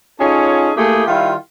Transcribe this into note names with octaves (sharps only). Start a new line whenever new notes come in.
C#4 D#4 F4 G#4 A4 C#5
A3 A#3 E4 G4 G#4
D#3 G3 E4 F4